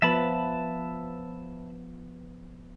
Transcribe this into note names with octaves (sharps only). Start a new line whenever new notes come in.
F3 B3 B4 E5 A5 B5